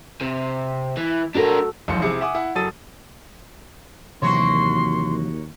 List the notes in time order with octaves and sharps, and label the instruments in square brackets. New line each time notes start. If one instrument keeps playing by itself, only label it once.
[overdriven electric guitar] C3
E3
[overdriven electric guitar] D4 A#4 [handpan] F#4 A4
[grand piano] E1 B1 F2 C6 C#7
C3 E4 G#4 C#7
E5 F#5 G#5 D6 D#6
E4 F#5
F#1 F#3 A4 D#6 A6 D#7
[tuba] D#2 [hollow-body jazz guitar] C3 E3 F#3 [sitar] A#3 F#4 C#5 [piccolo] C6